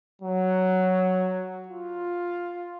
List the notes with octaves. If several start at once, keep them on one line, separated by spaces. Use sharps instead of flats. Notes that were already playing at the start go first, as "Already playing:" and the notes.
F#3
F4